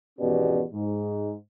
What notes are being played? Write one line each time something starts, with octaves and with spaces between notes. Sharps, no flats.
G#1 E2 B2 C#4 G4 D5
G#2